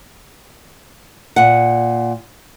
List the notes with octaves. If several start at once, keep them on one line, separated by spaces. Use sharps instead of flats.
A#2 F#5